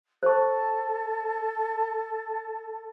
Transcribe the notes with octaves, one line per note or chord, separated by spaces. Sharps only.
A4 C5 C#6